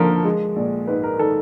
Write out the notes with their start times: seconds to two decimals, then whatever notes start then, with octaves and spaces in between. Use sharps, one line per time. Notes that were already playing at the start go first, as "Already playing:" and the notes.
Already playing: D#2 D3 F3 A4 A#4
0.25 G#3
0.56 A#1
0.87 G#2 B4
1.04 A#4
1.19 D#3 A4